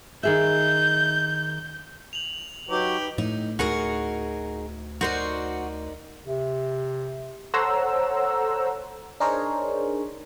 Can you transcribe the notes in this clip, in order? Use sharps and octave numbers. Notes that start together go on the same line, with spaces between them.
D#3 G#4 E5 G6
F7 F#7
F#3 D#4 G4 B4
A2 D#4
D2 D#4 F#4 G#4 A#4 C#6
D#4 F#4 A#4 C5 D5
C3
A4 C5 C#5 F#5 A#5 E6
D4 D#4 G#4 A#4 C5 C#5